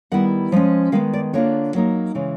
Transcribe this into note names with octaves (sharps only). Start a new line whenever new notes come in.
D#3 G3 B3 E4 F#5
F3 G#3 C#4
D#3 G#3 B3 F5
D5
D3 G3 A#3 D4 F4 C#5
F#3 A#3 D#4
C#3 E3 G#3